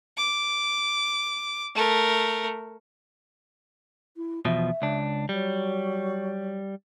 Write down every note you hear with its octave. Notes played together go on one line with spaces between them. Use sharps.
D6
A3 A#4
E4
E2 B2 F3 E5
C#2 D4
F#3 G3